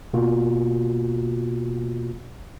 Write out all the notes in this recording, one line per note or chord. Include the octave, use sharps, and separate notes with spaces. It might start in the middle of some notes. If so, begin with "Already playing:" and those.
B2 A#3 F4 F#4